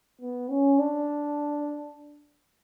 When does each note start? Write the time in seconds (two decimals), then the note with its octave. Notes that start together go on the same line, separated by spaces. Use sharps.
0.21 B3
0.50 C#4
0.79 D4